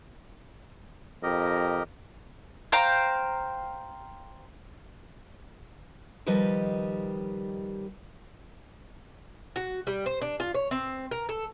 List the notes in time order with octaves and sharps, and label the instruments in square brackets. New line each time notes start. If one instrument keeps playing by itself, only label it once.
[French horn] F2 [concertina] G4 A#4 D#5
[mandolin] C5 F5 G5 A#5
[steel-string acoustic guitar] D#3 F3 G3 B4 D#5
[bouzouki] F#4
G3
C5
D4
F4
C#5
C4
A#4
A4